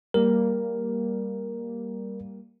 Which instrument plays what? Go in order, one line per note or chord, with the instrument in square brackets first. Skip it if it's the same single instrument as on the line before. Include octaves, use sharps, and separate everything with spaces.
[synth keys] G3 A#3 [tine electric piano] A#4